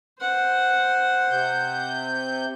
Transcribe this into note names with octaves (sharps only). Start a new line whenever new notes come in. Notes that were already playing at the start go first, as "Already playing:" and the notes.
C5 F#5
C3 G6